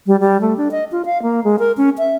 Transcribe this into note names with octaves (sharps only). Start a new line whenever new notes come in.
G3
G3
A3
D4
D#5
F4
F5
A#3
G#3
A#4
C#4
E5